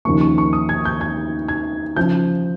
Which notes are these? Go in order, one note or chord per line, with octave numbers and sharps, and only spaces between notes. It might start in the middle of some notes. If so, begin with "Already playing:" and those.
D#2 C#3 F3 A#3 C#6
C#6
C#6
D#6
G#6
G6
G#6
G#6
C#3 F3 G6